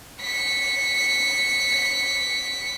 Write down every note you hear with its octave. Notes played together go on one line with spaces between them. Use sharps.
B6 C#7